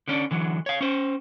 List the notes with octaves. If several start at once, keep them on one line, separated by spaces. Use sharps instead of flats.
D3 C#4 D4
D3 E3 F#3
C#5 F5
C#4 C5